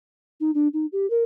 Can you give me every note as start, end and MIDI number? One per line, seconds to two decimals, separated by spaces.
0.40 0.51 63
0.54 0.68 62
0.73 0.86 63
0.92 1.09 67
1.10 1.24 70